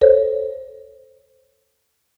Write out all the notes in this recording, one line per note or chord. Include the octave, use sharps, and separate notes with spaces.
A4 C5 C#5